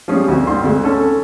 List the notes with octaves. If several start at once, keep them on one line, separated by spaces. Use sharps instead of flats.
F3 G3 G#3 C#4 G#4
D2 F#4
G2 C6
D2 G#3
C#4 A4